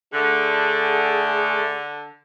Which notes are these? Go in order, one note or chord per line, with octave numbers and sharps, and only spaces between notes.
D3 A3 G#4